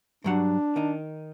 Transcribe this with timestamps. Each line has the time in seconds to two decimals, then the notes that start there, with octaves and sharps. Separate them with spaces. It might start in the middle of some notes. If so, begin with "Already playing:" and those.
0.24 G2 F#3 D4 F#5
0.76 D#3 D#4